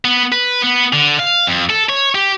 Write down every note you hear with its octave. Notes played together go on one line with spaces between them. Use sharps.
B3
B4
B3
D3
F5
F2
A4
C#5
G4